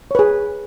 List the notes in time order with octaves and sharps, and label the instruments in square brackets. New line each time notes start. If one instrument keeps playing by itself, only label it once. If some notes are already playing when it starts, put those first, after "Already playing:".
[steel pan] C#5
B4
G#4